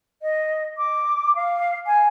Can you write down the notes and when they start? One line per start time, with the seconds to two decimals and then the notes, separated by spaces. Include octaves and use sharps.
0.22 D#5
0.77 D6
1.35 F5
1.87 G#5